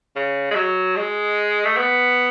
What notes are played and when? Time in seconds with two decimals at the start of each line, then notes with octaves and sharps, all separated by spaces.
0.16 C#3
0.51 G#3
0.55 F#3
0.96 G#3
1.65 A3
1.77 B3